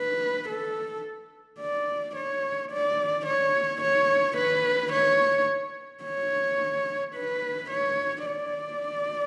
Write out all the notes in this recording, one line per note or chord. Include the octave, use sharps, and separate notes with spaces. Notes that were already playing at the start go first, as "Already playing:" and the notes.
Already playing: B4
A4
D5
C#5
D5
C#5
C#5
B4
C#5
C#5
B4
C#5
D5